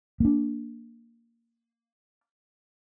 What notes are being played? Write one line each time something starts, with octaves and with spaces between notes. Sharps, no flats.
A#3 D4